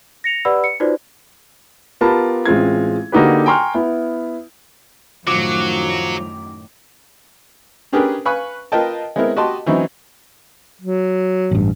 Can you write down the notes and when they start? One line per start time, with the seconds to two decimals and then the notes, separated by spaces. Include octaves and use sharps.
0.24 A#6 C#7 F7
0.45 G4 B4 D5 F#5 B5 E6
0.64 C#7
0.80 D#4 F4 F#4 B4 C5 D5
2.01 B3 F4 G4 A#4 A5 B5
2.45 A1 G#3 C4 F4 G#6
3.12 D3 A#3 D#4 F#4 G4 B4
3.46 G5 G#5 A#5 C6 C#6 F6
3.74 B3 E4
5.27 F#2 A2 D#3 F3 F#3 D6
7.93 C#4 D4 G4 G#4 A#4 B4
8.25 B4 F5 G#5 B5 C#6 F#6
8.72 F4 A#4 B4 D#5 G5 A5
9.16 G#3 B3 C4 E4 A#4
9.36 F#4 G4 D#5 A5 C6
9.66 E3 F#3 C4 C#4 D#4 E4
10.82 F#3
11.51 A1 G2